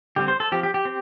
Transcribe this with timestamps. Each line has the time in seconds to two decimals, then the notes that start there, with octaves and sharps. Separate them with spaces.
0.16 D3 G3 C4 G4
0.28 C5
0.40 A4
0.52 F3 C4 G4
0.63 G4
0.74 G4
0.85 C4